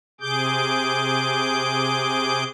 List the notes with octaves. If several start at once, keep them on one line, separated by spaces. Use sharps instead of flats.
C3 G#4 D6 G6